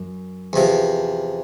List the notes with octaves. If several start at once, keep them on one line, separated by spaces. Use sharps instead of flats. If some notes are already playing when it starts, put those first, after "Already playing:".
Already playing: F#2
E2 C3 F3